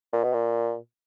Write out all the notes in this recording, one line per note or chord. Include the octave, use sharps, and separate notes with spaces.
A#2
B2
A#2